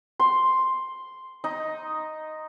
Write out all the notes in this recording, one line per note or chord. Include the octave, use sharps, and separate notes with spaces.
C6
D#4